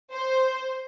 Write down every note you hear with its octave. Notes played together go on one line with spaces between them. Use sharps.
C5